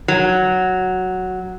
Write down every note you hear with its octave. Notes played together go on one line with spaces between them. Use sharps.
F#3